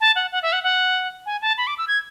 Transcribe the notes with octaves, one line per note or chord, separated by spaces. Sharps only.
A5
F#5
F#5
E5
F#5
F#5
G#5
A5
B5
D6
E6
G#6